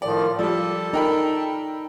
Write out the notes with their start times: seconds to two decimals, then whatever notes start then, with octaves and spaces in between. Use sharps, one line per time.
0.02 A2 D#3 F3 D5
0.39 F3 G3 A4 D5
0.93 D#4 A#4 G5 B5